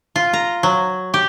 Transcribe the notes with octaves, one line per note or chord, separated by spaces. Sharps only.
F4
A#5
F#3
G4